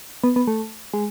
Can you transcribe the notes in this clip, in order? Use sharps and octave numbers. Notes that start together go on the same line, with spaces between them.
B3
B3
A3
G#3